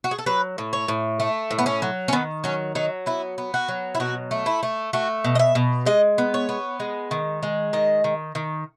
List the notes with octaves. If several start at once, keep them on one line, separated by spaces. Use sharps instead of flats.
F#4
G#4
A4
F#3 B4
A2
C#5
A2
A3
A2
B3
C#4
F#3
C#4
D#3 B3
F#3 C#4
F#3 D#4
B3 E4
B3
F#4
F#3
E4
B2 F#4
A3
E4
A3
A3 F#4
B2
D#5
E5
B2
G#3 D#5
B3
C#5
B3
G#3
D#3
G#3
D#3 D#5
D#3
D#3